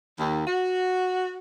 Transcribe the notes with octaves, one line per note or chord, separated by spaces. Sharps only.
D#2
F#4